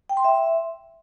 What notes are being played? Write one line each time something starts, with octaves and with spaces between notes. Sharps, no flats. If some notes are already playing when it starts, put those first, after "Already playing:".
G5
C6
E5